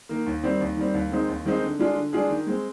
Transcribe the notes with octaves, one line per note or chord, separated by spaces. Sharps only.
D#3 A#3
D#2
D#3 G3 C4
D#2
D#3 G3 C4
D#2
D#3 G#3 C4 D#4
D#2
D#3 G#3 C4 D#4
D3
G#3 D4 F4 G#4
D3
G#3 D4 F4 G#4
D#3
G#3 C4